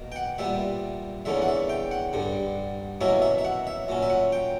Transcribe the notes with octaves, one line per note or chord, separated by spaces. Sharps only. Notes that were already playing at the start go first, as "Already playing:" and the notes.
Already playing: B2 A#3
G5
F#5
A#2 G3 B3 E5
E2 D3 A#3 C#4 E5
F#5
E5
G5
F#5
G2 D3 G3
B2 F#3 A#3 C#4 E4 E5
E5
E5
F#5
E5
A#2 F#3 C#4
E5
F#5
G5